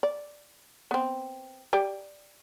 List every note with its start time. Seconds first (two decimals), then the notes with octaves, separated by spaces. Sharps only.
0.03 D5
0.91 B3 C4
1.73 G4 D5 G5